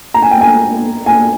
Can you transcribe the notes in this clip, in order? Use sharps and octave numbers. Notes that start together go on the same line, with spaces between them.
A#5
G#5
G5
G#5
G#5